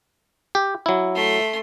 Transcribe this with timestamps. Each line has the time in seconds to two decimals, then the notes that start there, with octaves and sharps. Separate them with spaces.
0.55 G4
0.86 F#3 E4
1.14 A3 C6